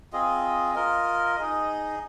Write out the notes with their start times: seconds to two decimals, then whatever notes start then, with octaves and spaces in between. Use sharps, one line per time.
0.13 C4 F4 G#4 D#5
0.75 F4 A#4 D#5
1.37 D#4 G#4 D#5